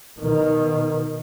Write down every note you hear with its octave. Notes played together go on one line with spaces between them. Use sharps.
B2 D#3